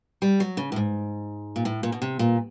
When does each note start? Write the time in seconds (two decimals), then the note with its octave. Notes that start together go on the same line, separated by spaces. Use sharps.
0.22 G3
0.40 F#3
0.57 C#3
0.72 A2
0.76 G#2
1.56 A#2
1.65 A2
1.83 A#2
1.92 B2
2.02 C3
2.19 A#2